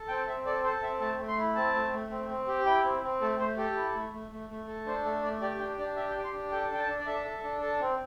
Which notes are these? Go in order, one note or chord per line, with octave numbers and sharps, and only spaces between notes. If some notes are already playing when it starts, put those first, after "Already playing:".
Already playing: A4
C4 G5
C4 E5
A4 D5
A4 C5
C4 E5
A3 A5
A3
C6
E4
C4 A5
A3
A3
C4
C4
G4
E4 G5
C4
C4
A3 A4
A3 C5
G4 A4
E4
A3
A3
A3
A3
A4
D4 C5
A3 A4
A3 D5
G4 D5
D4 G5
D4 D5
G4 E5
G5
G4
C6
D4
A4 G5
D4 G5
A5
D4
D5
A4 E5
A4
D4
A4
C4